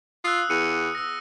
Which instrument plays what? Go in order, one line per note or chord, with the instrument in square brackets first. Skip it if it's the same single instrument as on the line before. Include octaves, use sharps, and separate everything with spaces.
[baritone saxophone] F4 [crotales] D#6 E6 F#6
[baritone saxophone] E2 [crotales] C#7 D#7
[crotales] E6 A#6